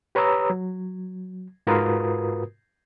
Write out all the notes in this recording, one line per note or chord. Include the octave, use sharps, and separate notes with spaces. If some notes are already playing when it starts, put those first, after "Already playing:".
G4 B4 C#5 A#5 D#6 E6
F#3
G#2 F4 F#4 A#4 B4 D#6